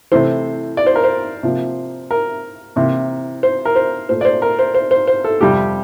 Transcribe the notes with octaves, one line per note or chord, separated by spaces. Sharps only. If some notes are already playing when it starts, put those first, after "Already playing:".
C3 E3 A3 C5
D5
C5
A#4
C5
C3 F3 A#3
A#4
C3 E3 A#3
C5
A#4
C5
A#2 A3 C5
D5
C5
A#4
C5
C5
C5
C5
A4
F2 C3 G3 G4